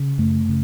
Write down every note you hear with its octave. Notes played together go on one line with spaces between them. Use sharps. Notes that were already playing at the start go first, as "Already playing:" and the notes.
Already playing: C#3
F#2 A3
C#3